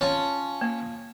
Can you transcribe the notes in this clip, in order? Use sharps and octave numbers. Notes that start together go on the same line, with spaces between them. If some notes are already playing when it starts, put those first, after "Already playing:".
C#4 F4 C#5 A5
A#3